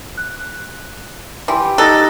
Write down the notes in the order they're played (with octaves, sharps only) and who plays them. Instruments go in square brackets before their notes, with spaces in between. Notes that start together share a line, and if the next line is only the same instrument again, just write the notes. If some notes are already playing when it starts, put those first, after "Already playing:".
[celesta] F#6
[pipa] E3 [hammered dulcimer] G4 [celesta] A5 C6 D6
[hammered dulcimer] D#4 [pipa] A4 [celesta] F#6 A6 A#6